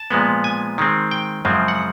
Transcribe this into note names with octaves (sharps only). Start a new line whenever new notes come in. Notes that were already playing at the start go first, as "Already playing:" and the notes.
Already playing: A5
A#2 F3 G#3 B3
G#5
D#3 G#3 C4
G5
F#2 C#3 F3 G#3 C4
F#5